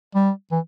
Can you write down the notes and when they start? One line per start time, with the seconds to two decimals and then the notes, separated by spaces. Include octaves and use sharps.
0.15 G3
0.52 E3